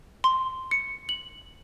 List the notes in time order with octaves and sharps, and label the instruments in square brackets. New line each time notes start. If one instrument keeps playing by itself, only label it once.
[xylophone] C6
C#7
F#7